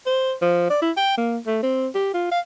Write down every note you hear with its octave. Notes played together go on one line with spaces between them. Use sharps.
C5
F3
D5
E4
G5
A#3
A3
C4
G4
F4
F5